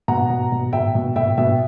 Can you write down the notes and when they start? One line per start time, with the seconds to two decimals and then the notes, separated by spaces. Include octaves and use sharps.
0.08 B2 F#5 A#5
0.30 B2
0.52 B2
0.73 B2 E5 G5
0.95 B2
1.16 B2 E5 G5
1.37 B2 E5 G5